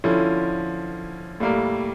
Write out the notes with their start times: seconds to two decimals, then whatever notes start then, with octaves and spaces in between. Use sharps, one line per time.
0.04 D3 F3 C#4 E4
1.40 A2 G3 A#3